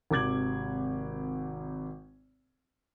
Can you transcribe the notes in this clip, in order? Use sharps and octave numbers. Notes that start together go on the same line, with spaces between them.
G#1 C3 D6 G#6 F#7